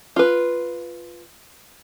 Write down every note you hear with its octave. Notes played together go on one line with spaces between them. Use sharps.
F4 B4